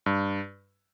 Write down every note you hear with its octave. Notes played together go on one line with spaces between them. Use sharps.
G2